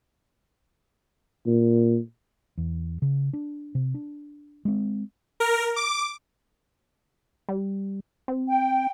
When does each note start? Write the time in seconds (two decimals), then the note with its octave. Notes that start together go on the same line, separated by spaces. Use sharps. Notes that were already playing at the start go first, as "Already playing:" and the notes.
1.46 A#2
2.58 E2
3.02 C#3
3.33 D4
3.75 C3
3.94 D4
4.65 G#3 C4
5.40 A#4
5.76 D6
7.49 G3
8.28 C4
8.48 G5